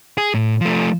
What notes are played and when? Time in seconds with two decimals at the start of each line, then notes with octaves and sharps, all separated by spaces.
0.18 G#4
0.34 A2
0.61 F3 A3